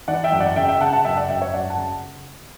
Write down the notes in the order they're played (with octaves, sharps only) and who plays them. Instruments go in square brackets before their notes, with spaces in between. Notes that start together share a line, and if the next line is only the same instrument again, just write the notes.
[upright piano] E3 D5 F#5
E5 G5
F#2
D5 F#5
C#3 E5 G5
E5 G5
C#3 F#5 A5
F#5 A5
F#2 E5 G5
D5 F#5
F#2 E5 G5
C#5 E5
F#2 D5 F#5
F#5 A5
C#3